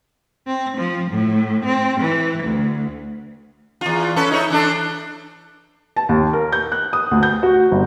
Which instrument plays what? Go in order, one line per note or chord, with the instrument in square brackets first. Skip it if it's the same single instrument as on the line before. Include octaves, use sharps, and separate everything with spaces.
[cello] C4
F3
A2
C4
E3
D2
[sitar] E2 F4
C#4 A4 B4
D#4 E4 C#5
E3 D4 A4
[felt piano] A5
D#2
A#4
G6
F#6
D#6
D2
G6
F#4
G1